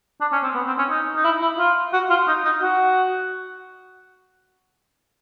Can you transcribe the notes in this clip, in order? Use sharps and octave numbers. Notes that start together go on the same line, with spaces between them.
D4
C#4
C4
B3
C4
C#4
D#4
D#4
E4
E4
F4
F#4
F4
D#4
D#4
F#4